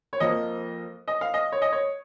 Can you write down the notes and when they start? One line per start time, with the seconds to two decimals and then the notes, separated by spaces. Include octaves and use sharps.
0.13 C#5
0.20 F2 F3 A#3 D#5
1.08 D#5
1.21 F5
1.34 D#5
1.52 C#5
1.62 D#5
1.72 C#5